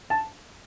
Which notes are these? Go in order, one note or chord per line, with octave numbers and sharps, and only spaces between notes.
A5